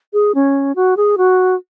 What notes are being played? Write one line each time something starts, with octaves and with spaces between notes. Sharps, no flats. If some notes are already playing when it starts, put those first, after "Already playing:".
G#4
C#4
F#4
G#4
F#4